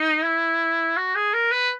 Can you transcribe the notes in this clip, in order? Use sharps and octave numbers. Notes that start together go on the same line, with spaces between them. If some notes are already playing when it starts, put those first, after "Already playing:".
Already playing: D#4
E4
F#4
G#4
A#4
B4